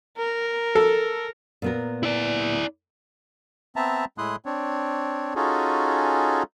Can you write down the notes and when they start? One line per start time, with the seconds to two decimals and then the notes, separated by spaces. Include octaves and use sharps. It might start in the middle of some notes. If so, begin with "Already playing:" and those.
0.18 A#4
0.75 A4
1.62 A#2 B3 A#4
2.03 E4 D5
3.76 B3 C4 E5 A5 A#5
4.18 A2 G#3 E4 C6 D#6 F#6
4.46 C4 D4 C#5
5.35 C#4 D#4 F4 F#4 G#4 A4